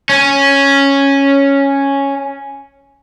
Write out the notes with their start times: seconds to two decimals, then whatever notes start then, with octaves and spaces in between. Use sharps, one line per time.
0.09 C#4